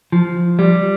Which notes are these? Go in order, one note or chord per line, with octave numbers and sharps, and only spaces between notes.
F3
G3